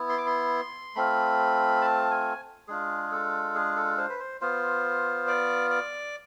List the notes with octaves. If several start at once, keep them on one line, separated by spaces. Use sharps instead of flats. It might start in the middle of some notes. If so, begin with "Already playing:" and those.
Already playing: B3 E4
C6
D6
C6
A3 C4 F4 B5
A5
G#5
G#3 D4 F4 G#4
A4
G#4
A4
C5
B4
C5
B3 F4 C5
D5
D5